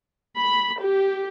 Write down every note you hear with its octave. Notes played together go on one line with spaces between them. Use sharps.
B5
G4